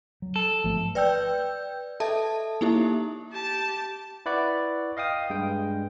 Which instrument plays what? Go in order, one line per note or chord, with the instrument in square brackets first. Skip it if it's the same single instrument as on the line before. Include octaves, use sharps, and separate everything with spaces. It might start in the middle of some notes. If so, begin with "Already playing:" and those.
[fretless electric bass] F#3
[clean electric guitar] A4
[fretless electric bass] G#1 F3 A3
[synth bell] B4 D5 G5 E6 G6
A4 D#5 E5 A5
A#3 D#4 E4 G4
[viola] G4 A5
[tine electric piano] E4 B4 D5 F#5 C#6
D#5 F5 G5 D#6
G2 G#3 G5